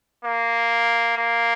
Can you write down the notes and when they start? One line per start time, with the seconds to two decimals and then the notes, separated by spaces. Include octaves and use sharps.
0.24 A#3
1.17 A#3